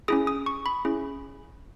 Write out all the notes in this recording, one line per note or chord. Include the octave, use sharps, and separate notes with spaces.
C#4 E4 G#4 D#6
D#6
C#6
B5
C#4 E4 G#4